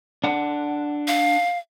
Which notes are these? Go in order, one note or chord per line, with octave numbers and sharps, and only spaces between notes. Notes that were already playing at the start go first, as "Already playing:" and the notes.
D4 F#5
F5